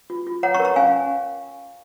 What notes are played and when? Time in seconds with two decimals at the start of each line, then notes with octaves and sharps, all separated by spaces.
0.10 F4
0.27 F4
0.43 C#5 F#5 A#5
0.54 A#5 C#6
0.60 A#4
0.65 A#5 C#6
0.76 C#4 F5 G#5